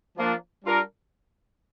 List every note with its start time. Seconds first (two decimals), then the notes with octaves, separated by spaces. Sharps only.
0.17 F3 A#3 D4
0.64 G3 D4 F4 A#4